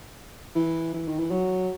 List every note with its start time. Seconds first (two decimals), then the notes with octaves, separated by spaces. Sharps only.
0.55 E3
0.94 E3
1.08 D#3
1.19 E3
1.31 F#3